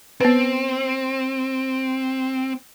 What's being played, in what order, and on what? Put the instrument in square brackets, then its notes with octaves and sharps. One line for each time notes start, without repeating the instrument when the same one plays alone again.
[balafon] B3 B4 [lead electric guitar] C4